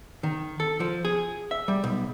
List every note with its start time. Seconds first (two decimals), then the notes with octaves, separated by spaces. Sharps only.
0.23 D#3
0.60 A4
0.80 F3
1.05 G#4
1.51 E5
1.68 G3
1.84 B1